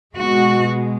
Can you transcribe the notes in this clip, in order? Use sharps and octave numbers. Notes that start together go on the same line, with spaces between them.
B2 G#3 F#4